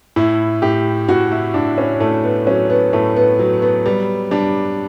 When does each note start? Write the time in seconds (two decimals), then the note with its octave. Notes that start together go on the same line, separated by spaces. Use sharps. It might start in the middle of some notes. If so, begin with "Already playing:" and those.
0.16 A2 E4
0.62 A2 G4
1.09 A2 F#4
1.32 E4
1.54 A2 D4
1.78 C#4
2.00 A2 A3
2.24 B3
2.46 F#3 C#4
2.70 B3
2.93 A2 A3
3.16 B3
3.39 F#3
3.62 B3
3.85 G3 B3
4.31 G3 D4